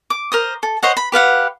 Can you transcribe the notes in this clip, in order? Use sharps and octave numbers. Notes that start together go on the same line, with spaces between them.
D6
A#4 C5 D#6
A4
C5 C#5 D#5 F#5
B5
G4 B4 F5 F#5